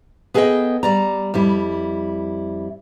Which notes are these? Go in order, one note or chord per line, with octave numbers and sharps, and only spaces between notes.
B3 G#4 A4 B4 D#5 G5
G3 D5 A#5
F2 G3 E4